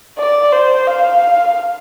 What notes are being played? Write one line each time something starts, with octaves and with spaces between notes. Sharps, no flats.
D5
C5
F5